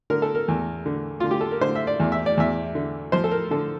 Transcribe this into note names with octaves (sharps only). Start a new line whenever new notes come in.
D3 A#4
A4
A#4
E2
D3
D3 F4
G4
A4
A#4
D3 C5
E5
D5
E2
E5
D5
E2 E5
D3
F3 C5
A4
A#4
D3 A4